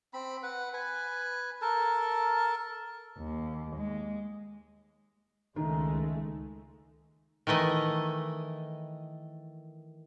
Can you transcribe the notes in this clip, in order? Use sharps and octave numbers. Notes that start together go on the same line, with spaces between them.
C4 B5
B4 F#5
B4 G#5
A4 A#4 A5
D#2
G#3
C#2 D#3 G#3 A3
D#3 E3 A3 D#5